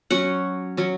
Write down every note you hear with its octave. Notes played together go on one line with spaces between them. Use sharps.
F#3 C#4 F#5
F#3 C#4